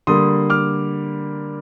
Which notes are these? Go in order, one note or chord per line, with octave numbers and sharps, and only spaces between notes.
D3 G3 A#3 C6 D#6
D6 F6